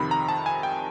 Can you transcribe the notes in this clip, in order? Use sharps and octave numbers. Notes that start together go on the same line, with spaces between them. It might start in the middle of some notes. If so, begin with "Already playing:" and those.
Already playing: F2 C3 D#3 B5
A#5
A5
G#5
G5